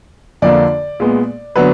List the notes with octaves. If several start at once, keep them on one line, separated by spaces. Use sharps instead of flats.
F2 D3 F3 A#3 D4 D5
A#2 G#3 B3
D3 F#3 B3 D4 B4